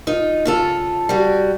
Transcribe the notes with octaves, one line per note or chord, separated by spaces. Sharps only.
D#4 F4
C#3 F4 A4
G3 F#4